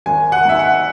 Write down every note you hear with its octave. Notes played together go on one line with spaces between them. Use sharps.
G#1 G#5
F#5
G#2 E5
F#5